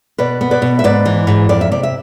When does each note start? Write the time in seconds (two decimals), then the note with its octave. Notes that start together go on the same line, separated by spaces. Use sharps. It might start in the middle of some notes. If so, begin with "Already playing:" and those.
0.18 B2 B4 D5
0.41 B3
0.51 B4 D5
0.62 B2
0.79 E5
0.84 G#2 B4 D5
1.05 E3
1.27 G#2
1.49 F2 D5
1.61 E5
1.71 C3 D5
1.83 E5